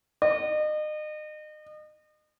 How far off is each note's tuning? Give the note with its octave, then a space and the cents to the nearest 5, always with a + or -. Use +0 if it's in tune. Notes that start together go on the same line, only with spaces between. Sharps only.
D#5 -35